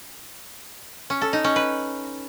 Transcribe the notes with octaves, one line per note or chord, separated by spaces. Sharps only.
C#4
A4
D#4
C#4
B4